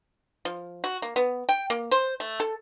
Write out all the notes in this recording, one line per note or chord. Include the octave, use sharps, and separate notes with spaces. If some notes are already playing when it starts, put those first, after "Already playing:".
F3
F#4
A#3
B3
G5
A#3
C5
A3
A4